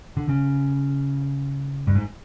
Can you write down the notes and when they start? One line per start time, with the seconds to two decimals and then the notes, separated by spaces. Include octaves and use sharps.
0.17 D3
0.29 C#3
1.87 G2
1.95 G#2